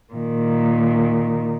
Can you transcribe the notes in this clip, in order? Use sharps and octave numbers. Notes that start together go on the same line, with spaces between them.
A#2 D#3